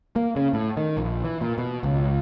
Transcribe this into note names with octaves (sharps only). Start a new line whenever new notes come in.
A#3
C#3
A2
D#3
A#1
E3
A#2
B2
C#2